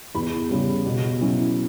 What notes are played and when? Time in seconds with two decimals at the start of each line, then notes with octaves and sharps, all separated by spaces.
0.15 E2 B5
0.50 C#3 G3
0.86 B2
1.21 F#3 C#4 E4